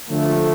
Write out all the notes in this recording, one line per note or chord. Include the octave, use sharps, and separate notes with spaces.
D3 F3 A3